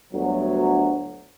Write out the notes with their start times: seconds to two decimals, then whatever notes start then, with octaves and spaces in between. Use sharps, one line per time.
0.13 G1 D2 F#3